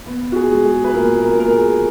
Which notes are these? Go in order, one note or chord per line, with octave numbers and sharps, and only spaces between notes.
B3
F#4
G#4
G#3
G#4
B4
A#2 A#4
A#4
A#2 A#4
G#4